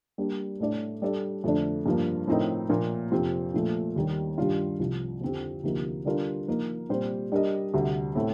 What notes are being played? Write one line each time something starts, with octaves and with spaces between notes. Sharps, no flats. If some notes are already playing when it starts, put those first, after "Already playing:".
G3 A#3 D4
A2 A3 D4 A4 D5
G3 D4 A4 D5
F2 D3 A3 D4
G2 F3 A#3
A2 F3 C4 D#4 A#4
A#2 F3 A#3
F2 C3 F3 C4
A#2 F3 A3
D#2 D#3 G3
G2 D#3 G3 D4 F4
C2 C3 F3
F2 D3 F3 C4 G4
D2 C3 F3 A#3 D#4
D3 G3 D4 F4 A#4
F3 A#3 D#4
A#2 G3 C4 G4 C5
G3 D4 G4 A#4 D#5
D2 C3 G3
A2 A3 C4